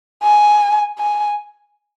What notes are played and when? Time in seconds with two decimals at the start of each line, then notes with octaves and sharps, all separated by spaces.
0.23 G#5
0.98 G#5